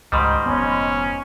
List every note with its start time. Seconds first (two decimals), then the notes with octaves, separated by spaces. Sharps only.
0.12 C#2 G#2 D#3 G3 D#5 B5 C6
0.46 F1 B3 C#4